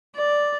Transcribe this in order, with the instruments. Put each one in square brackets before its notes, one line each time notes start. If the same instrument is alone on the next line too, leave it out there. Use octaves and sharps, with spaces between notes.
[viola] D5